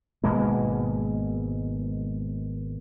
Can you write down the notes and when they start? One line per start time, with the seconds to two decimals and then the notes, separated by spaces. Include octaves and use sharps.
0.24 G#1 B2 G#3 A#3